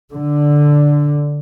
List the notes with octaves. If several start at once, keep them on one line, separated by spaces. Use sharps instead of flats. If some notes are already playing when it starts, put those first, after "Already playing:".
D3